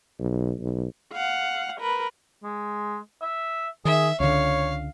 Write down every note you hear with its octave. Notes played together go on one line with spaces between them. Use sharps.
B1
B1
F5 F#5
A#4 B4
G#3
E5
D#3 G#4 E5
C#2 D3 C#5 F5